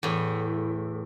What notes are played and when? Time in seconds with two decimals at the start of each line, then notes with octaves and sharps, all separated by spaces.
0.03 E2 A2